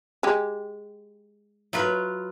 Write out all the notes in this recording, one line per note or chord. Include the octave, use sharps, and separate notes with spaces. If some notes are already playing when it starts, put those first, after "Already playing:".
G#3 G4
F#3 F4 B4